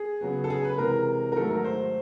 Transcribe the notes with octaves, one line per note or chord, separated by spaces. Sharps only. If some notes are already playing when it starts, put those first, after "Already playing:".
Already playing: G#4
C#3 F#3 B3
A4
G#4
B4
C3 E3 G#3 A#4
A#4
G#2 D#3 F#3 A3 A4
A#4
C5